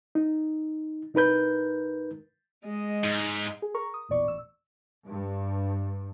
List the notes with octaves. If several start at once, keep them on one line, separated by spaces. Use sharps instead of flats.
D#4
C2 D#4 A#4 B4 G6
G#3 D#5
G#2
G#4
A#4 A#5 C#6
D#6
A#1 E2 A#2 D5 C#6
A1 E6
G2